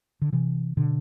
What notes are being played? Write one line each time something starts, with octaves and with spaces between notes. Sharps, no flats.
D3
C3 E3
B2 D3